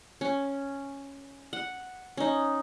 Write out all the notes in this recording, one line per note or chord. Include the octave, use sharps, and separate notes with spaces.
C#4
F#5
C#4 D#4